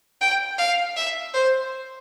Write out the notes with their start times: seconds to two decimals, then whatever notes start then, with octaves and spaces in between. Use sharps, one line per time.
0.21 G5
0.58 F5
0.96 E5
1.34 C5